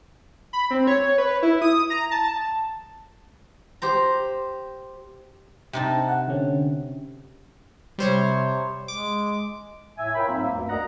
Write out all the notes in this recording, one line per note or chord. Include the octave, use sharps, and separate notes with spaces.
B5
C4
C#5
B4
E4
D#6
A#5
A5
G4 C5 A#5
C3 D#4 A5
F#5
D3 C#4
C3 G3 C5 C#5
G#3 D6
A2 E5 G#5
F4 A#4 C#5 G5 B5
G#2 F#3 A#3 C4 E5
A#3
D2 G2
A#4 D5 D#5 F#5 A#5